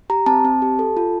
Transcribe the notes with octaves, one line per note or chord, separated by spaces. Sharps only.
G4 A#5
C4 A5
C4
G4
A4
F4